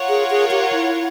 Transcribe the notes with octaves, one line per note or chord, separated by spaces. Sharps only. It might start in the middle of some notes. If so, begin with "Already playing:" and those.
Already playing: F4 A#4 C#5 F#5
G#4
G#4
G4
E4